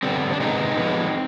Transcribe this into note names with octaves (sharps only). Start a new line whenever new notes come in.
D3 G3 B3 C4
D4
C3 D#3 G#3 B3 C4 D#4
D3 F3 G#3 B3